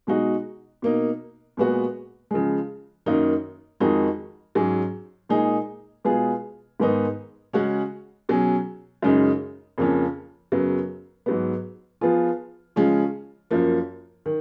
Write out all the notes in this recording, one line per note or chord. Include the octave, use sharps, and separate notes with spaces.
B2 G#3 D#4 F#4
B2 A#3 D#4
A#2 G#3 B3 F#4
C#3 F3 G#3
F#2 D#3 A#3 D#4
F2 D#3 G#3 D#4 F#4
G#2 F#3 C#4 G#4
A#2 G#3 D#4 G#4
B2 G#3 B3 F4 G#4
G#2 D#3 G#3 B3 D#4
C#3 G#3 C#4 F#4
B2 F#3 C#4 G#4
F#2 C#3 G#3 D#4
F2 C#3 F3 A#3 C#4
F#2 C#3 F#3 B3
G#2 F#3 B3
F3 B3 F4 G#4
C#3 F3 G#3 C#4 F4
F#2 F3 A#3
D#3